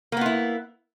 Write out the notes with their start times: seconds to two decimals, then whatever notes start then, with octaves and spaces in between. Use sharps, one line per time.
0.12 A#3
0.17 B3
0.21 F4
0.26 E4